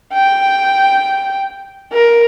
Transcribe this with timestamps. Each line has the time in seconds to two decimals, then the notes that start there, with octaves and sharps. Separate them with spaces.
0.13 G5
1.93 A#4